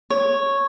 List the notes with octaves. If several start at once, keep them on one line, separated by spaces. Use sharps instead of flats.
C#5